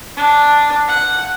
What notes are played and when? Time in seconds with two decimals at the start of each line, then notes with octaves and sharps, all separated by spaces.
0.17 D4
0.88 F#5